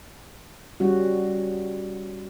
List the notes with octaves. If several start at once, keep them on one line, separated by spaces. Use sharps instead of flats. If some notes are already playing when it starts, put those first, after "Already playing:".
G3 C#4 F#4